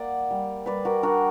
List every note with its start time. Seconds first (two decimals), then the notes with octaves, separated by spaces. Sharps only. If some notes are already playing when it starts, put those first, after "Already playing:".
Already playing: A#3 D5 F#5
0.31 G3
0.66 G3 B4 D5
0.85 F#4 A#4
1.03 D4 F#4 A#4